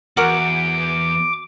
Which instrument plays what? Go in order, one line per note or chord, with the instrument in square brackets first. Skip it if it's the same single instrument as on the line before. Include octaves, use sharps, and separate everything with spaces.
[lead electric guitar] E2 [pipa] F#4 A#4 F#5 [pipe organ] D6